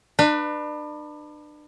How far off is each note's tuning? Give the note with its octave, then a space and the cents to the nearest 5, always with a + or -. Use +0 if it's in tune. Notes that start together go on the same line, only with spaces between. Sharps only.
D4 +35 B4 +0